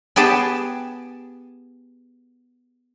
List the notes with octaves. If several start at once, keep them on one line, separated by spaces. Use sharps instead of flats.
B3 G4 G#4 G5 A5